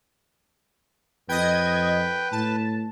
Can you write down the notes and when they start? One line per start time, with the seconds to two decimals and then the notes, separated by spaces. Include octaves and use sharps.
1.29 F2 B4 D#5 G5 G#6
2.32 A2 A5